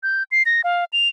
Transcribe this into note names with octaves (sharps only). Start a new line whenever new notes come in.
G6
C7
A#6
F5
F7